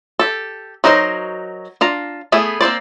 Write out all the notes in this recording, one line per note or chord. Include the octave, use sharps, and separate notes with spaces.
G4 A4
F#3 D#4 F#4 A#4 C5
D4 F4 A#5
A3 B3 E4 G#4
A#3 C4 C5 D5